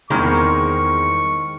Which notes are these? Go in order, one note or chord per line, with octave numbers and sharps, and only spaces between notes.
E2 D#3 G#3 A#3 C4 D#4 C#6